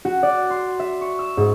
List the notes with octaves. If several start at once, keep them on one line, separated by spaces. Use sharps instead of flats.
F#4
D5
C6
E5
C#6
E6
G#2